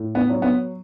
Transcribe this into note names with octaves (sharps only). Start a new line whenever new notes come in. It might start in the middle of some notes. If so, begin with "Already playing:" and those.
Already playing: A2
B3
F#3 B3
B3